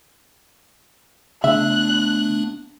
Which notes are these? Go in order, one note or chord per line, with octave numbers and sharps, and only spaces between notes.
C#3 A3 B3 D4 E5 F#6